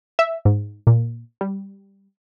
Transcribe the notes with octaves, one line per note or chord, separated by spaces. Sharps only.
E5
G#2
A#2
G3